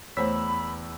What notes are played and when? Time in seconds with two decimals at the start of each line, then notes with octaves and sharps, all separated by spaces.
0.17 E2 A3 C5 C#5 B5 E6 B6